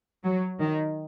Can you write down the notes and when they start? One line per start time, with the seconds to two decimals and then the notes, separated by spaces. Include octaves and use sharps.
0.24 F#3
0.60 D#3